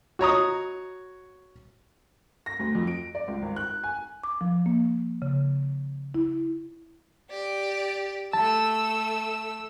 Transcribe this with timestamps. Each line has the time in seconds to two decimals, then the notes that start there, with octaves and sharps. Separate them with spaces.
0.19 F#4 C#5 A#5 D#6
2.46 A#6
2.59 D2
2.75 F2
2.87 D7
3.15 D5
3.28 C#2
3.42 G#1
3.56 F#6
3.84 G#5
4.24 D6
4.41 F3
4.66 A#3
5.22 C#3
6.14 E4
7.30 G4 D5
8.33 A3 A5 E6